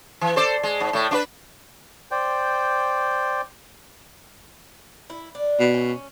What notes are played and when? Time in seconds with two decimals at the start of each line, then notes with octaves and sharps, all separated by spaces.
0.21 E3
0.36 A4 C5 D5
0.63 G#3
0.80 G#2
0.93 A2 A3
1.11 D4 F4 B4
2.11 C5 D5 G5
5.10 E4
5.35 D4
5.59 B2
5.74 C#4